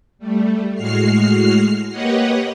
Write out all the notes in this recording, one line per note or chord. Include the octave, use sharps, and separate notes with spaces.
G3 A3
A2 G#3 F#4 F6 C7
A#3 G4 B4 C#5 D#5 F#5